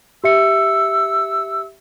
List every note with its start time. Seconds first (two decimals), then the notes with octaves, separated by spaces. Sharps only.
0.24 G4 E5 E6 C#7